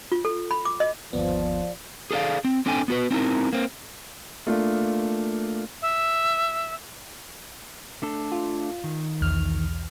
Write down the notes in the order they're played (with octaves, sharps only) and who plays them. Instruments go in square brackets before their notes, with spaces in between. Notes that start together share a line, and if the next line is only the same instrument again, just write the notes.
[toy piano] F4
A4
B5
D6
D#5
[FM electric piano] G1 D#2 B3 [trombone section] F3 [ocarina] D5
[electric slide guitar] G#4 A4 D5 F5
C4
C4 D4 A4 G5 G#5
B3 F#4 B4
C4 D#4 E4 A#4
A#3 C4
[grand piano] A3 A#3 D4 F4
[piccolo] E5
[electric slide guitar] A3 D4 A4
[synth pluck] F4
[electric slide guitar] D#3
[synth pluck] B1 E2 F6